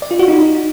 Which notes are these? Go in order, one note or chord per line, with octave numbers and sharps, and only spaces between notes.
D5
F4
F#4
D#4